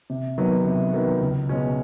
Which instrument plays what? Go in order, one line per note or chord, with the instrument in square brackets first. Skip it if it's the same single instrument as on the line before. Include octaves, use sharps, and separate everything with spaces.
[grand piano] C3
D#3 F#3 B3
C3
D#3 F#3 B3
C#2
B2 G#3 C#4